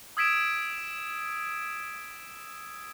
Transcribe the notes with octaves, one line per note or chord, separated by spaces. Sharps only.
D#6 E6 G#6 B6 D7 E7